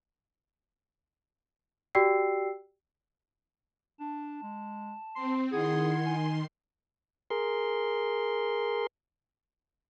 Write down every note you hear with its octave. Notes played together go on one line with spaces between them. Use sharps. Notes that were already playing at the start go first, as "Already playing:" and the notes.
F#4 G4 D5 G5 E6 C7
D4 A5
G#3
C4 C6
D#3 E4 G#4 F#5 C6 G#6
G#5
G#4 A#4 C6